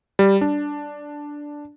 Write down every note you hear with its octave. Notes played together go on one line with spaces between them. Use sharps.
G3
D4